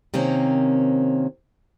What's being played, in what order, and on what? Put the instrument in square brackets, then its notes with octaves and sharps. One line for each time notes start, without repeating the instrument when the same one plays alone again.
[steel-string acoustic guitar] C3 D#3 A#3 C4 C#4